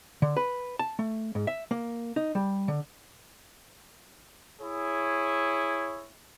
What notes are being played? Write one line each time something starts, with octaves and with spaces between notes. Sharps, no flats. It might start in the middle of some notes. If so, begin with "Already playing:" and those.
D3
B4
A5
A3
G#2
E5
A#3
D#4
G3
D3
E4 G#4 C#5